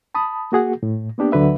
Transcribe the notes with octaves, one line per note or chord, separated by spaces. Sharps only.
A5 B5 D#6
A#3 F#4 G#4 F#5
A2
A#3 B3 D4 G4
D2 D3 F#3 B4 E5